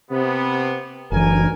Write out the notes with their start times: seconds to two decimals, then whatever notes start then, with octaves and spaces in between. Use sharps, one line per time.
0.11 C3 B3
1.12 F#1 D2 E3 A#4 G#5